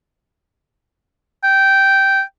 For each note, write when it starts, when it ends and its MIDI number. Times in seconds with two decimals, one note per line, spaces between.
1.43 2.22 79